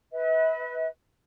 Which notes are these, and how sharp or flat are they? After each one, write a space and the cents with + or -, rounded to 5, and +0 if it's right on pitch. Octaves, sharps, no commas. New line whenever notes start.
B4 +0 E5 -45